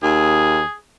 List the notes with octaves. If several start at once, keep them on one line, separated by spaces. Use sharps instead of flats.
D#2 G#4